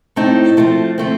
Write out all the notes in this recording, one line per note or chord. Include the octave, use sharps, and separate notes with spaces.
A2 A3 C4 D#4
F3 A3 C4
F3 A3 C4